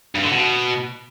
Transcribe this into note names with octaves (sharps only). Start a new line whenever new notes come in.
G2
D3
B2